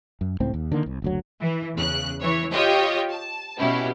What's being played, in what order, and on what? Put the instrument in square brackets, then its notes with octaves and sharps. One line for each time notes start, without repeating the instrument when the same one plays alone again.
[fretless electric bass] F#2
C#2 A2 C4
D#2
D3 D#3 A#3
C2
F#1 D2 F#3
[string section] E3
E2 C#3 F#6
E3 C#5
F4 G4 C#5 D#5 G5
A5
B2 C#4 E4 G4